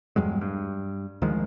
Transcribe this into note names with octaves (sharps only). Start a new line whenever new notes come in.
E2 G2 F#3 G#3
G2
D2 D#3 F3 G#3